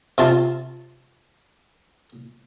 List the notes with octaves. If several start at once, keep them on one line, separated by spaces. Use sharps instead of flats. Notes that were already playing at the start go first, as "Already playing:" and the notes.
C3 F4 A5